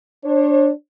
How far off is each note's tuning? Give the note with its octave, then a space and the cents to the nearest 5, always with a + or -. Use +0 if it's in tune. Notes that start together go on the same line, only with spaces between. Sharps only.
D4 +0 C#5 -45